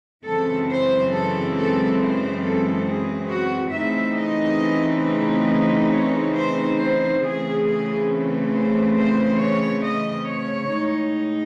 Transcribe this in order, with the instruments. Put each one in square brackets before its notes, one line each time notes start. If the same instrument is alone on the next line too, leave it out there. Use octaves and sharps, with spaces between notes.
[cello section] F#2 C#3 E3 G#3 C4 A4
C5
A4
A4
C5
A4
G#4
F#4
C#3 E3 A3 C4 D#4 E5
D#5
D#5
C#5
C5
C5
C#3 E3 A3 C4 G#4
G#4
C5
C5
C#5
D#5
C#5
A2 G#3 D#4